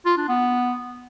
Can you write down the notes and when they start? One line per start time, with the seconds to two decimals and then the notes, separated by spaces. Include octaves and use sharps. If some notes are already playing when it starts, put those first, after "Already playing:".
0.06 F4
0.17 D4
0.29 B3